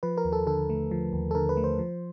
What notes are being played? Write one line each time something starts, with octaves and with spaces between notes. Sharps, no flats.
F3 B4
A#4
D#2
A4
D3 A4
A3
F3
D#2
A4
D3 A#4
B4
A3
C5
F3